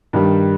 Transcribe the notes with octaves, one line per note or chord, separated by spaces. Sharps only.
G2 D#3 G3